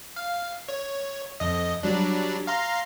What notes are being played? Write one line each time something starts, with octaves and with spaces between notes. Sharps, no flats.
F5
C#5
F2 D#5
F#3 G3 D4
F5 A#5 C6